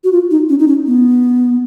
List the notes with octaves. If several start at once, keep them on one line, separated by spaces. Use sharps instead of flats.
F#4
F4
D#4
C#4
D#4
C#4
B3